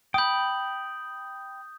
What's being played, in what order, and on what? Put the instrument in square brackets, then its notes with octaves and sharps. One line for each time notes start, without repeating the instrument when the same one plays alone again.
[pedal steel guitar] G5 B5 [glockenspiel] D#6 G6